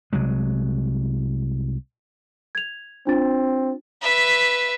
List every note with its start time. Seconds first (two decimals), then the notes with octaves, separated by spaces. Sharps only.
0.13 C2 F#3 G#3
2.55 G#6 F7
3.07 C4 D4 F4 A6
4.01 B4 E5